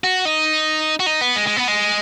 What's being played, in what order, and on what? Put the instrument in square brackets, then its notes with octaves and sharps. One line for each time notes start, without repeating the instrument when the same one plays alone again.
[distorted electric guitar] F#4
D#4
F#4
D#4
B3
G#3
G#3
B3
G#3